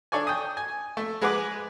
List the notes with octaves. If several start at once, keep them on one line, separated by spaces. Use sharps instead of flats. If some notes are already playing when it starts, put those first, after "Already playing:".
D4 A4 C#5 D5 G#5
G5 D#6
G#5
A3
G#3 G#4 B4 F#5 B5 D6